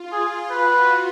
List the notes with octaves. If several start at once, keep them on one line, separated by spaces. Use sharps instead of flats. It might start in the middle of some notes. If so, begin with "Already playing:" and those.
Already playing: F4
G#4
F#4 B4